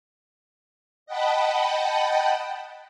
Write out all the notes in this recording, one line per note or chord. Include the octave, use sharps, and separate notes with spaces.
D#5 F#5 G5 A5 B5